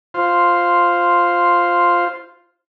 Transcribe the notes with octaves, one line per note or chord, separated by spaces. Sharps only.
F4 C5